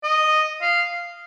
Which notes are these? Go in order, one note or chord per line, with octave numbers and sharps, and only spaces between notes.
D#5
F5